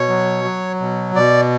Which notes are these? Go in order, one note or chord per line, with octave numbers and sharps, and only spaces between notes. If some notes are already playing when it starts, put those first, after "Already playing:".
Already playing: B2 C#5
F#3
F#3
B2
B2 D5